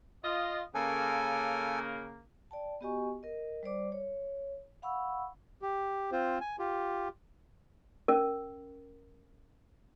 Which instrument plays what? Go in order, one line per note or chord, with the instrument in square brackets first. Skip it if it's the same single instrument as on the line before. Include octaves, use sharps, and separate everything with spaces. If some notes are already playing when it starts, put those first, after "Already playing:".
[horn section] F4 D#5
[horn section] C#3 A#3 [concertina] A4 G#5
[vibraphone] D5 G5 A5
B3 F#4 G4 D#5 G#5 C#6
A#4 D#5
G3 C5 D5 D6
C#5
F5 F#5 B5 C#6 E6
[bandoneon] G4
C4 F4 C5
G#5
F4 G4
[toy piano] C#4 A#4